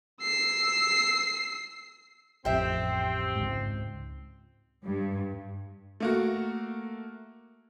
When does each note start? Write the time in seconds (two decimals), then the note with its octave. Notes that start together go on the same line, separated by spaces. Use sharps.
0.22 E6 C7
2.45 A1 F2 C4 G4 E5
3.36 C#2 G#2
4.86 G2
6.00 A3 A#3 F#4